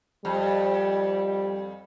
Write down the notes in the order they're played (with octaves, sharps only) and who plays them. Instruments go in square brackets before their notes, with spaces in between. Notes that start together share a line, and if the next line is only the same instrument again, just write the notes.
[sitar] F2 [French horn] G3